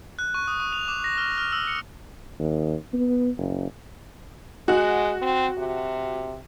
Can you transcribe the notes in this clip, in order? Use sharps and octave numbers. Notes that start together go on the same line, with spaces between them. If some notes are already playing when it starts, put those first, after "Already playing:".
F#6
C#6
D#6
C#6
F7
D6
A#6
F6
F6
E6
C#7
D#2
B3
F#1
G#3 F#4 F#6
C4
C3